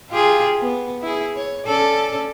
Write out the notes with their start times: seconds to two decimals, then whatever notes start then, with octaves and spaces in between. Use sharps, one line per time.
0.10 F4 G4 G#4
0.61 B3
1.02 E4 G#4
1.36 C#5
1.66 C#4 A4 D5